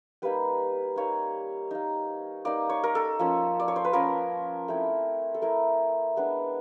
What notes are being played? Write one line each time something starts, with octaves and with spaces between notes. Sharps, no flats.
G3 A#3 D#4 B4
G3 A#3 D#4 C#5
A#3 D#4
A#3 D#4 D5
C#5
A#4
A4
F3 A#3 C#4 F4
D5
C#5
C5
B4
F3 A#3 C#4 F4 A#4
A3 C4 E4
A4
A3 C4 E4 A#4
G#3 B3 D4